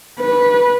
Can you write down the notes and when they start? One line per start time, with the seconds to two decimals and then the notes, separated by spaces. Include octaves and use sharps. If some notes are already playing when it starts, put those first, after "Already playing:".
0.20 B4